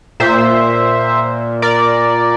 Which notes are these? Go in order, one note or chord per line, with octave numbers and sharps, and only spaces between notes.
A#2 C5 E5
A#4 D5